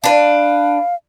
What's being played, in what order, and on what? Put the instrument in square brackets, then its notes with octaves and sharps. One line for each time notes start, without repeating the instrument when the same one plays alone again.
[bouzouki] D4 B4 [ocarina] F5